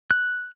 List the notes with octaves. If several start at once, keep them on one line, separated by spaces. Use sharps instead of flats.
F#6